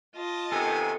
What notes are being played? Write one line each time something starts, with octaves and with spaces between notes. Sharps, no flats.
F4 D#5 A5
C3 D#3 B3 A4 G#5